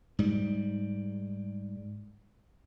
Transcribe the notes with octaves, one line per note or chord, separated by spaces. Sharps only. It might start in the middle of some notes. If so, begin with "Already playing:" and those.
G#2 G3